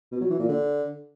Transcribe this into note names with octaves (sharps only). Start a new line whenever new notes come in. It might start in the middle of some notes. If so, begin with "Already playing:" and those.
B2
F#3
E3
A#2
D3